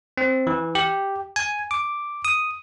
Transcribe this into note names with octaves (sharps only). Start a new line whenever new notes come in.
C4
E3
G4
G#5
D6
D#6